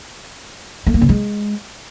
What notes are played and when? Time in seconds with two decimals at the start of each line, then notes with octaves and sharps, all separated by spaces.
0.86 A3
0.94 A#3
1.02 C#3
1.09 G#3